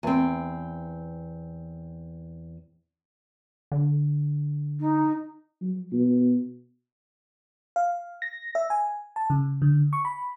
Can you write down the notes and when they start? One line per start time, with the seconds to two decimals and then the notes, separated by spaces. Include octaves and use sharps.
0.03 E2 C4
3.72 D3
4.80 D#4
5.61 F#3
5.92 B2
7.76 F5
8.22 A#6
8.55 E5
8.70 G#5
9.16 A5
9.30 C#3
9.62 D3
9.93 C#6
10.05 B5